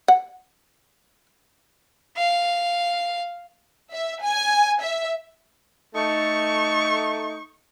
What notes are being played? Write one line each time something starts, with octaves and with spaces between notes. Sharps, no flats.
F#5
F5
E5
G#5
E5
A3 D#4 C#6